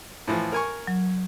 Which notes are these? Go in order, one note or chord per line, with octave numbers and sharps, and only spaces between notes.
A2 E3 F3
A#4 G#5 C#6
F#3